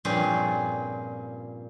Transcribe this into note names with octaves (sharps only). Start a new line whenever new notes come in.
G2 A#2 F3 C4 C#4 G#4